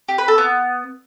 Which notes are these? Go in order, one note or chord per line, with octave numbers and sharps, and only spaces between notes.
G4
B4
A4
B3